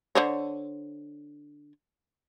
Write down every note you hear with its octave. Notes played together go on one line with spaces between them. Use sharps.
D3 C5 C#5